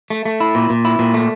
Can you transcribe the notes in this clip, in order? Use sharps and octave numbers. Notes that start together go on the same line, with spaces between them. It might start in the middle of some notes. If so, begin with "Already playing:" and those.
A3
A3
E4
A#2
A#2
E4
A#2
A3